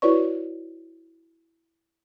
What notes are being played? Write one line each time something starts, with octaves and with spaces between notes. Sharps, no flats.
E4 F#4 B4 C#5 D5 C#6